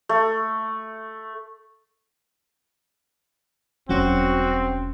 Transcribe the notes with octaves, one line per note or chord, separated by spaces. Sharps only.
A3
E1 F#3 G3 C4 C#4 F#4